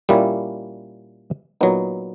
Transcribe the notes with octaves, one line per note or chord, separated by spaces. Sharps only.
A#2 G3 A#3 C#4 E4
A#2 F#3 B3 D#4